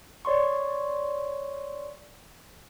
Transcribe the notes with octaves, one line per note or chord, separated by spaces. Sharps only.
C#5 D5 C6 C#6